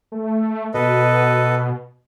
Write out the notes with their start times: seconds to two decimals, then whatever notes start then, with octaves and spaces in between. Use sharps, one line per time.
0.12 A3
0.74 B2 A4 B4 D#5